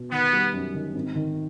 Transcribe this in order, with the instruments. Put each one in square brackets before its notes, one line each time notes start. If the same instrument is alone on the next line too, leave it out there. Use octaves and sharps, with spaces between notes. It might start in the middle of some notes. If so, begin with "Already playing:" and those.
Already playing: [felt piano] B2
[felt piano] D#3 [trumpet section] B3
[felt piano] G3
F#2
D#3
G#1
D#3